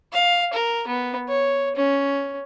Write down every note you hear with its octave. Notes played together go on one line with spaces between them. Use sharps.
F5
A#4
B3
C#5
C#4